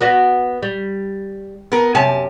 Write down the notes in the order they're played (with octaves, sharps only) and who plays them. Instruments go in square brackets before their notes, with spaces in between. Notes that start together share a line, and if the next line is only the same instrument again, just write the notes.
[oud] B3 F#4 D5
G3
[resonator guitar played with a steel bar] B3 A#4
[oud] F#2 G4 [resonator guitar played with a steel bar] C3 G#5 A5